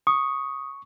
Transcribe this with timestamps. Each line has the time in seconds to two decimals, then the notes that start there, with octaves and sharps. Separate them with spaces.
0.07 C#6 D#6